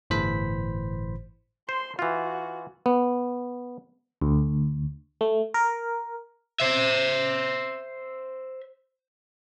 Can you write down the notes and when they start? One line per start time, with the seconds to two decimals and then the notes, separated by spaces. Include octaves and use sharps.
0.10 G1 A2 E3 C5 B5 B6
1.69 C5 C6
1.99 E3 F4 F#4
2.86 B3
4.21 D2
5.21 A3
5.54 A#4
6.60 C5 E5